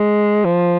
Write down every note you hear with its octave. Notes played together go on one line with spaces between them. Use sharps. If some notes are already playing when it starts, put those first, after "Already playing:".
Already playing: G#3
F3